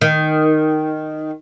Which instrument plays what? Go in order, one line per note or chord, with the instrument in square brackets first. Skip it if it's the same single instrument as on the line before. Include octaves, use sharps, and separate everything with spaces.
[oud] D#3